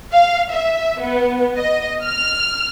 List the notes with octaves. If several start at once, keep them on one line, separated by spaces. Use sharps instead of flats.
F5
E5
B3
D#5
F6